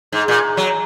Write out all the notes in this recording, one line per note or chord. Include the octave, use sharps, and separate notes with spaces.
G#2
A#2
F#3